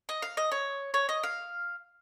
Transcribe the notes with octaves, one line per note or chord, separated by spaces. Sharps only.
D#5
F5
D#5
C#5
C#5
D#5
F5